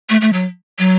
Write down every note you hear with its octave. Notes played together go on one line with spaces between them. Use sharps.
A3
A3
F#3
F#3